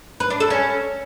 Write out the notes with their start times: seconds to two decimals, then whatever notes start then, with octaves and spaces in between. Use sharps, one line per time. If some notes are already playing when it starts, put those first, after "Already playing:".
0.20 B4
0.30 D4
0.40 A4
0.50 C#4